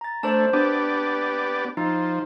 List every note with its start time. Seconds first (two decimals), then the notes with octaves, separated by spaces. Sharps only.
0.01 A#5 A6
0.23 A3 D4 C5 A5
0.53 B3 D4 G4 D5
1.77 F3 D#4